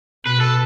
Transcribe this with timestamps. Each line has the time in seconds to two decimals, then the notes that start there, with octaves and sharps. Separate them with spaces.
0.25 B2 B4
0.40 A4